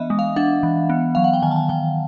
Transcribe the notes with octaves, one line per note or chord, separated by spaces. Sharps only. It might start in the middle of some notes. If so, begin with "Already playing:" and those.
Already playing: E3 B3 D4 D#5 E5
G#3
F5
D4 F#5
E3
B3
F#3 F5
F#5
G5
D#3 G#5
A5
G#5
D#3 G5